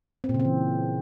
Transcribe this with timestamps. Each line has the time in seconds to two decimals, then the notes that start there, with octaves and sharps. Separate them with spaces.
0.24 C4
0.29 A#2
0.34 C#3
0.40 C4
0.45 E3